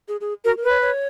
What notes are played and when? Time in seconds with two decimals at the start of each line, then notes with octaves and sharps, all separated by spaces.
0.08 G#4
0.21 G#4
0.45 F#4 A#4
0.57 A#4
0.64 B4
0.69 C#5
0.82 C#5